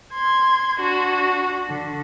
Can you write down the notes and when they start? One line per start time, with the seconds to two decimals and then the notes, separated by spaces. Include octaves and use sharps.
0.12 C6 G#6
0.80 D4 F#4
1.69 D3